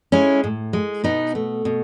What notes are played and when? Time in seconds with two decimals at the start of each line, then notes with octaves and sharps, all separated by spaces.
0.12 G#3 C#4 E4
0.44 A2
0.73 G#3
1.04 B2 B3 D#4
1.35 A3
1.65 B2